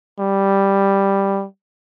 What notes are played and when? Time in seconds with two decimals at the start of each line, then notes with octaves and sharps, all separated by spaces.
0.19 G3